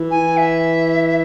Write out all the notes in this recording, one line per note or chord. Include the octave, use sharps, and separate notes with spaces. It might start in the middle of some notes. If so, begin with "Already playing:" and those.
Already playing: E3
G#5
E5